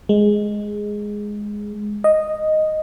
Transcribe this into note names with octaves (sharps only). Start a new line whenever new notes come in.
G#3
D#5